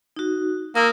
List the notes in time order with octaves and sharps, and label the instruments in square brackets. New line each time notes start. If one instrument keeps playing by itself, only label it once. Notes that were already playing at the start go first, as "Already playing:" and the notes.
[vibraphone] D#4 F#4
[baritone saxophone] A#3 [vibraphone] A#4 D#6 E6